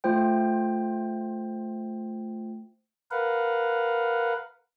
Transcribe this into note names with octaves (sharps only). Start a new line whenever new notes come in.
A3 F4 C5 G5
A#4 B4 F5 F#5